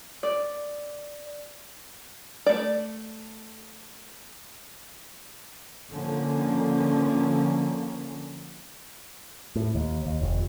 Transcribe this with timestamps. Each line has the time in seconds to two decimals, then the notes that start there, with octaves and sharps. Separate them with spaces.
0.23 D5
2.46 A3 D5
5.91 D3 F3 A#3 C#4
9.55 A2
9.75 D#2
10.06 D#2
10.22 F1